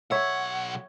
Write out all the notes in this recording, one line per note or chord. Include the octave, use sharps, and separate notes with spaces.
B1 C#5 E5 F#5